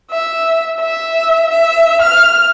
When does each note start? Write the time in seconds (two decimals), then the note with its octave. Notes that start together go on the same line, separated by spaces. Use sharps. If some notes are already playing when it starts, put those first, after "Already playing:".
0.11 E5
0.81 E5
1.50 E5
2.02 F6